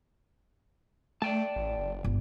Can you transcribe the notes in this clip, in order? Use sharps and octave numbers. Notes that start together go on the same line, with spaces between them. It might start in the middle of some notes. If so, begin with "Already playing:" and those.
A3 D5 G5 A5
A1
F#1
G1